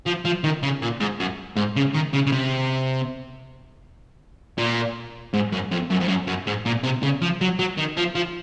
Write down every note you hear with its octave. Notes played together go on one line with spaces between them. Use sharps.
F3
F3
D#3
C#3
A#2
G#2
F#2
G#2
C#3
D#3
C#3
C#3
C3
A#2
G#2
F#2
F2
F#2
F2
F#2
F#2
G#2
A#2
C3
C#3
F3
F#3
F#3
D#3
F3
F3